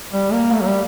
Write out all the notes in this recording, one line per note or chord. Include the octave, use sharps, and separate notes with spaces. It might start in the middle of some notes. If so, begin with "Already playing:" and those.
G3
A#3
A3
F#3
G3